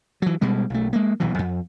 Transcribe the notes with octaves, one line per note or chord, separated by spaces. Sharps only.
E3 F#3
B2 G3 G#3
B1 A3
G#3 A#3
D#1 B1 B2 E3
F2